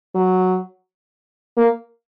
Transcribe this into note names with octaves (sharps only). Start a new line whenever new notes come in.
F#3
A#3